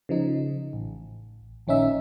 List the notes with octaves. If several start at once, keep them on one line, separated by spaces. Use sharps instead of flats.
C#3 F3 D#4
A1
A#1 D#3 C#4 D#4 E5